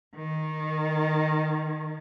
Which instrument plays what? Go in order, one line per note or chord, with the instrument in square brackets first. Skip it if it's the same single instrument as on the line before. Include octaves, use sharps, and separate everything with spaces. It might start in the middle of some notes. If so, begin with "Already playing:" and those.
[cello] D#3